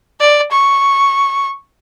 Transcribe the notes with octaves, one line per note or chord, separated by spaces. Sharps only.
D5
C#6